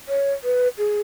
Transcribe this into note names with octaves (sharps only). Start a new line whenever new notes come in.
C#5
B4
G#4